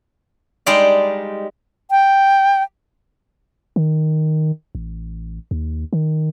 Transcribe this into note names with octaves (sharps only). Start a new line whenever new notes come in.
G3 G#3 D#4 G4 D5 F5
G5
D#3
A1
D#2
D#3